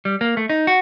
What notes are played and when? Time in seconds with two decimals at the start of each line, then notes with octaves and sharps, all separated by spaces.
0.05 G3
0.21 A#3
0.37 A3
0.50 D#4
0.67 F#4